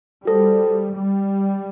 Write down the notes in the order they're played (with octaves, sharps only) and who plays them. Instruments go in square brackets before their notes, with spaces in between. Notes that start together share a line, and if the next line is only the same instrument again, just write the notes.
[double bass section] G3 [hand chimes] F#4 A4 C5
[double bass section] G3